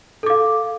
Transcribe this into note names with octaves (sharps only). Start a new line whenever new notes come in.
A4 F5 D6